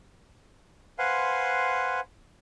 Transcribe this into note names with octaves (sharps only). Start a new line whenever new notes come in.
B4 C5 F5 F#5 G#5 C6